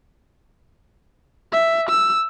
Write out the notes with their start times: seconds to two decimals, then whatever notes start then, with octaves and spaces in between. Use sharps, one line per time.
1.52 E5
1.89 E6